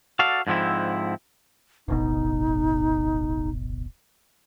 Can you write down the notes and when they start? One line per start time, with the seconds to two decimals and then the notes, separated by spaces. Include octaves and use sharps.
0.19 F#4 A4 D5 F5
0.47 G#2 D3 F3 C4 E4
1.88 D1 G1 B2 D#4